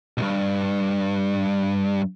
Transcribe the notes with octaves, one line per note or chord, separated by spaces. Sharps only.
B1 G2